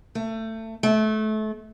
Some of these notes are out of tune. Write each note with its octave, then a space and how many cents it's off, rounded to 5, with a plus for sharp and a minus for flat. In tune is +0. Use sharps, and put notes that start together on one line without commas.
A3 +25
A3 -25